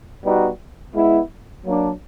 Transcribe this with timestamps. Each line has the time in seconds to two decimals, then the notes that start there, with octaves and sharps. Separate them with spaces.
0.25 B2 G3 B3 D#4 F#4
0.95 G#3 B3 E4
1.66 F#3 A#3 D4